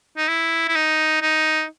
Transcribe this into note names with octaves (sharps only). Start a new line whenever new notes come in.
D#4
E4
E4
D#4
D#4